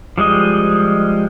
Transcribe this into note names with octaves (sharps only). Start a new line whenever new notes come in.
F3 G3 G#3 D#5